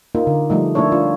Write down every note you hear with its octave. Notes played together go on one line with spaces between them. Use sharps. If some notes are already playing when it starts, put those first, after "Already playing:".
A#3 D#4 F4
D3
F3 G3 A3 D#4
A3 A#3 D4 E4 A4 C#5
D4 F4